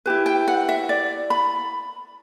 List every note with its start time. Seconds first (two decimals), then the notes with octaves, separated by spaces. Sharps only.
0.06 E4 G4 B4
0.26 G5
0.48 F#5
0.69 E5
0.89 D5
1.30 B5